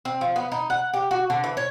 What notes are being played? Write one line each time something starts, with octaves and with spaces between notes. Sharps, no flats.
C4
F3
B3
D#4
F#5
G4
F#4
D3
E3
C#5